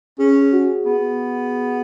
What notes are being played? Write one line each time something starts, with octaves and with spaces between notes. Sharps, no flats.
C#4 G#4
G#4
F#4
B3 G#4